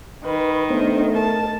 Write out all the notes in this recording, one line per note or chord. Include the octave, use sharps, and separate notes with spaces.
D#3 B4 B5
A3 B3 D4 C5
A#4 A5